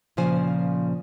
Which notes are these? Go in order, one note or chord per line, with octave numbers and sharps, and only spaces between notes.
A#2 C#3 F3 C5 G#5